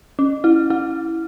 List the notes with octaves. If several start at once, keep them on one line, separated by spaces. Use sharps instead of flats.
C#4
E4
E4